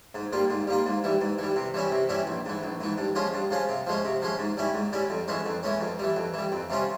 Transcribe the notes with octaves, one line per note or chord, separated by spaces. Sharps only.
G#2
G3 A#3 F4
G#2
G3 A#3 F4
G#2
E3 G3
G#2
E3 G3
C3
E3 G3 C#4 E4
C3
E3 G3 C#4 E4
A#1
G#2 E3
A#1
G#2 E3
G2
F3 G#3 C#4 F4
G2
F3 G#3 C#4 F4
C3
F3 G#3 C#4
C3
F3 G#3 C#4
G#2
G3 C#4 E4
G#2
G3 C#4 E4
F2
E3 G#3 C#4
F2
E3 G#3 C#4
F2
E3 G3
F2
E3 G3
F2
C3 G3 C#4 F4